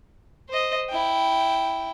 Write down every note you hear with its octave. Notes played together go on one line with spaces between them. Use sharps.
C5 D#5
E4 G5